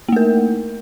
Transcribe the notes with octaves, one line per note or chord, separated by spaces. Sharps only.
A3 A#3 A#4